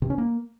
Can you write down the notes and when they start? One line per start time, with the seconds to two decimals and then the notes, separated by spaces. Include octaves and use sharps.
0.02 C3
0.10 C#4
0.18 A#3